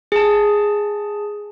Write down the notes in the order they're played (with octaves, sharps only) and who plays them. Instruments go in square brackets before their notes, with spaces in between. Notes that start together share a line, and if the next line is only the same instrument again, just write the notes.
[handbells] G#4 A5